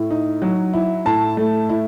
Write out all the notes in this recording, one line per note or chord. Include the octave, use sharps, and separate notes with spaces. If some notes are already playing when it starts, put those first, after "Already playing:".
Already playing: A2
D#4
F#3
E4
A2 A5
A3
E4